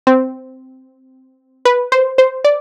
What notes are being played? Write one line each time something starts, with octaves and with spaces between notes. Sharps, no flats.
C4
B4
C5
C5
D5